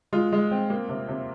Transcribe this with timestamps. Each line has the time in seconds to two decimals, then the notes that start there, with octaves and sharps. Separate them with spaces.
0.13 G#3 F4
0.32 G#3
0.51 C4
0.70 A#3
0.89 C3
1.09 C3